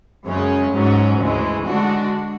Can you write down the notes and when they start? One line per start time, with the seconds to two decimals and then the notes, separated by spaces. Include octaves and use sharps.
0.26 F#2 C#3 G#3 C#4
0.73 G#2 F#3 C#4
1.19 D2 C#3 E3 G#3
1.67 D3 G#3 D4 F#4